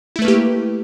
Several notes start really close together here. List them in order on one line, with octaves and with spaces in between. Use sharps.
E4 A3 B4 A#3 G4